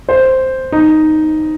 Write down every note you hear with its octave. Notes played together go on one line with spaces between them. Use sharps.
C5
D#4